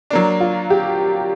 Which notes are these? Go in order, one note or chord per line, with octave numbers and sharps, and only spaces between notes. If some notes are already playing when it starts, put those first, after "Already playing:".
F#3 A#3 D4
F4
G4